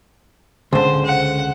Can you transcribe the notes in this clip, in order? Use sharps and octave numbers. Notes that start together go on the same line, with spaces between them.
C#2 D3 C5
F#5